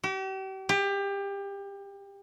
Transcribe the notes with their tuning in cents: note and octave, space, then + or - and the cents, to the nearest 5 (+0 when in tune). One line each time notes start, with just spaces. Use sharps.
G4 -40
G4 +25